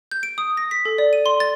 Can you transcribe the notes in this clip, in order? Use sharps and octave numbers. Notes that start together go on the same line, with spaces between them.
G6
D7
D#6
A#6
B6
A4
D5
D#7
C6
A6